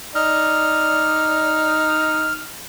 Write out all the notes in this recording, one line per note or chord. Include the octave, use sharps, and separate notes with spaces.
D#4 D5 F6